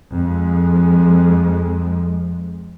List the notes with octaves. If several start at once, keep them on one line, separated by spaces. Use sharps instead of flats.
F2 G#3